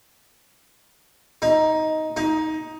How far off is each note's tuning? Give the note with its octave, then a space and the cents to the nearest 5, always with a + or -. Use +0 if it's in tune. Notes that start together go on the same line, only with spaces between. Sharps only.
D#4 +10
D#4 +15